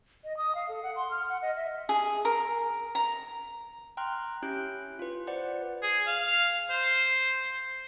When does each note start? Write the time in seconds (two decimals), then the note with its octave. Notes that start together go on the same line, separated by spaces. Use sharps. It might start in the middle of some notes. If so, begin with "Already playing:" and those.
0.24 D#5
0.37 D#6
0.55 F5
0.68 A4
0.83 F#5
0.96 C6
1.11 F6
1.29 F#5
1.42 D#5
1.56 E5
1.89 G#4
2.25 A#4
2.95 A#5
3.97 G5 A#5 C6 F6 F#6
4.42 C#4 E4 G4 F#6 G6 D7
4.99 F4 B4
5.27 B4 C5 D5 F#5
5.82 G#4
6.07 F5
6.70 C5